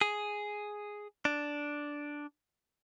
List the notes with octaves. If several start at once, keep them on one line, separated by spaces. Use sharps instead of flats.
G#4
D4